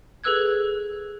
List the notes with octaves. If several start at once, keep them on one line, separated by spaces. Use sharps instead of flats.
G#4 A4 B4 E6 F#6 G#6